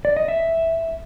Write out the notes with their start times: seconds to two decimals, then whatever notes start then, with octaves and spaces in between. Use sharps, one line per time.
0.05 D5
0.17 D#5
0.28 E5